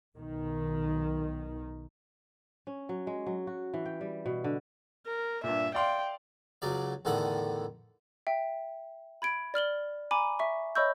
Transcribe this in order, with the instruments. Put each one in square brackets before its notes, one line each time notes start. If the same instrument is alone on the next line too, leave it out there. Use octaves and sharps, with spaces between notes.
[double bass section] B1 D#3
[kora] C#4
F#3
G#3
F#3
F#4
E3
G5
G3
B2
D3
[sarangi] A#4
[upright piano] G2 A#2 [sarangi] E5
[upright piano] D5 F5 C6 [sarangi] G5
[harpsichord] C#2 C#3 F#3 D5
E2 A2 D3 D#3 A4 F#5
[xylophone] E5 G5
B5 G#6 D7
D5 F6 F#7 G7
G#5 A#5 B5 D6
E5 C#6
C#5 D#5 B5 C#6 E6 G6